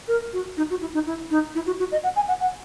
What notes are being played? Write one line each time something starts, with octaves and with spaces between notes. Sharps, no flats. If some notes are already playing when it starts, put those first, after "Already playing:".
A#4
F#4
D#4
F#4
E4
D#4
E4
D#4
E4
F#4
F#4
D#5
F#5
G#5
F#5
F#5